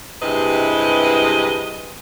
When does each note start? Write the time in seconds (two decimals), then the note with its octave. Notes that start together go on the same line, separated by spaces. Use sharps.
0.22 G2 C3 G#3 E4 B4 D#5